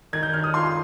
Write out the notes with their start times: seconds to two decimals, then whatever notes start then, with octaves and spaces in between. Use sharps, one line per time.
0.13 D#3 G#6
0.23 G6
0.33 D#3 F6
0.44 D#6
0.54 F4 C6